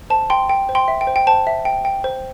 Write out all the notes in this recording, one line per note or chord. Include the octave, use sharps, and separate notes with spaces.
C5 A5
G5 C6
G5
C5
G5 C6
E5
G5
C5
G5
C5 A5
E5
G5
G5
C5